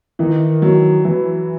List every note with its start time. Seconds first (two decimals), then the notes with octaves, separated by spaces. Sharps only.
0.19 D#3 E3
0.62 F#3
1.04 E3 F#3